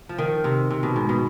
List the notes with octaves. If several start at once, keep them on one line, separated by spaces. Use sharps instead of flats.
F3
D#3
C3
C3
B2
G#2
B2